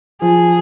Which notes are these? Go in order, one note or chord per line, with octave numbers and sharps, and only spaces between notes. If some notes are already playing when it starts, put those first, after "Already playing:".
F3 G#4